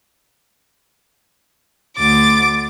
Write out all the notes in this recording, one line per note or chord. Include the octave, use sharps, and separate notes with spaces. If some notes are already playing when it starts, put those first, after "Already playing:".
D2 D6 A6